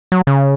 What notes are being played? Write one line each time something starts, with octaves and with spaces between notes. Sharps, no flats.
F#3
C#3